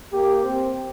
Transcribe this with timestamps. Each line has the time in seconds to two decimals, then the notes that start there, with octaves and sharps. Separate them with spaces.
0.13 A#3 G4
0.44 C4